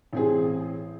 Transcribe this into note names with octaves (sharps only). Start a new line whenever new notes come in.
A1 C4 G#4